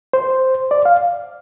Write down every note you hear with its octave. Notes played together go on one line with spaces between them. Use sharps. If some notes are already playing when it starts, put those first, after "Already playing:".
C5
D5
F5